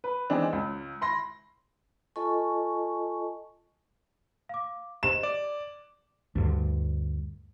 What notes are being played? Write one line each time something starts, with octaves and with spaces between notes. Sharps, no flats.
B4
E3 G#3 B3 C4 D4 D#4
C#2
B5 C6 A#6
F4 A4 D#5 G#5 A5 C#6
F5 D6
G4 C5 D#5 E7
D5 D6
D2 G2 D3